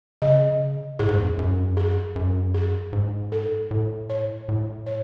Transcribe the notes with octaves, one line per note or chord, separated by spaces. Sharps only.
C#3 D#5
A2 G#4
G#2
E2
F#2
F#2
G#4
F#2
G#4
G#2
A4
A2
C#5
A2
C#5